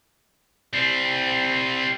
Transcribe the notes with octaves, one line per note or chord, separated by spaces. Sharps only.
G3 C4